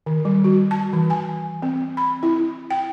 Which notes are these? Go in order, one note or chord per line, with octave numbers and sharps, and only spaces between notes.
D#3
G3
F#4
A5
E3
G#5
C4
B5
E4
G5